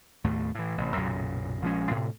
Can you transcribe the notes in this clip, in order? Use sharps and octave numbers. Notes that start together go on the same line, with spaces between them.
D#2 A2 A3
A2 E3
A1 C3
B1 F#2 A#2 C#3
A#1 F3 G#3 C#4
A2 C3